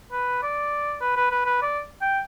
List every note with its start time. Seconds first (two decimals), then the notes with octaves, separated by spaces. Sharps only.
0.12 B4
0.42 D5
1.01 B4
1.17 B4
1.31 B4
1.46 B4
1.62 D5
2.01 G5